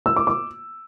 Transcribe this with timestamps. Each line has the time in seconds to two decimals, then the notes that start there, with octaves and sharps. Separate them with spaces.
0.06 E6
0.16 D6
0.27 D6